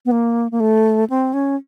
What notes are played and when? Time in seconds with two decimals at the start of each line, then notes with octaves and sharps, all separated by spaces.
0.05 B3
0.11 A#3
0.52 A#3
0.60 A3
1.10 C4
1.33 C#4